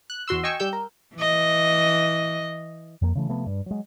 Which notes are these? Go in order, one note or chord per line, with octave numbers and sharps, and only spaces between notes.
F#6
E2 F#4 C6 E6
D#5 G5 G#5 C#6 E6
G3 G4 E6 G6
A#4
E3 D#5
F2 A#3
C#3 E3 A3
C3 F3 A3 B3
G2
F#3 G#3